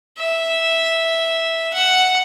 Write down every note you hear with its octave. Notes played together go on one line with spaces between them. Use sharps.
E5
F#5